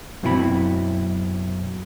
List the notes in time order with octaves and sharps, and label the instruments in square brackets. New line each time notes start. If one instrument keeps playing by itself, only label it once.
[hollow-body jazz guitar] F#2 B2 C4 E4 A4 B5